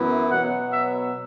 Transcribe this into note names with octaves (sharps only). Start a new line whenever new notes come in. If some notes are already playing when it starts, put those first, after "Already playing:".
Already playing: F#2 E3 B3 E4
B2 F#3 B3 F#5
E5